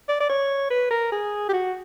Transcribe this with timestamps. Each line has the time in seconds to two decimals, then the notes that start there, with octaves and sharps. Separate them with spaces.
0.09 D5
0.20 D5
0.29 C#5
0.70 B4
0.91 A#4
1.12 G#4
1.49 G4
1.53 F#4